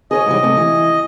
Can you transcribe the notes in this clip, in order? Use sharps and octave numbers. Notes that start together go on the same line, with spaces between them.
G#4 A#4 C#5 D#5
G#2 E3 G3
C3 A3
E3